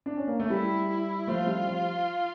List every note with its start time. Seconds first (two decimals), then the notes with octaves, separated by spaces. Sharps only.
0.06 D4
0.17 C#4
0.27 A#3
0.40 A3
0.50 G3 E4
0.89 E4
1.27 F3 A3 F4
1.47 G3
1.67 F3